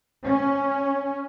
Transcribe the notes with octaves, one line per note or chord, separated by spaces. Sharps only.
C#4